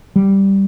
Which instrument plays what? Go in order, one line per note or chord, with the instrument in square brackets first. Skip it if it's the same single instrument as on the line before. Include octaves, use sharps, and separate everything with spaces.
[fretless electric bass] G3